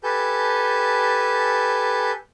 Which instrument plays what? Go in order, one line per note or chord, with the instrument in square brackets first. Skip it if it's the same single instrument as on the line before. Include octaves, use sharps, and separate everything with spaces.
[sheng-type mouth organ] G4 A4 B4 G#5 A5 G6